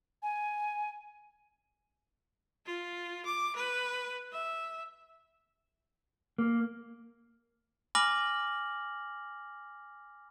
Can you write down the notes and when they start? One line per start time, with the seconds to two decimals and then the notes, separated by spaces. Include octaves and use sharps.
0.23 G#5
2.66 F4
3.25 D6
3.56 B4
4.32 E5
6.38 A#3
7.95 G#5 B5 D6 F6 A#6 F#7